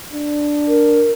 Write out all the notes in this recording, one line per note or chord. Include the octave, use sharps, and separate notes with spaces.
D4
A#4